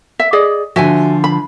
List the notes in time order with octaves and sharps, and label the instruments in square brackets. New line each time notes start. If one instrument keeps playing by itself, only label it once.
[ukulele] E5
G#4 D5 D#5
[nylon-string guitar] D3 F3 [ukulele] F#4 E5 G#5
[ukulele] B5